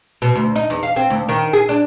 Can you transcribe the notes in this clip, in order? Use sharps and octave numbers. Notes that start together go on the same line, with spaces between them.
B2
D2
D#4
E2
F5
C4
D2
D#3
G#4
D4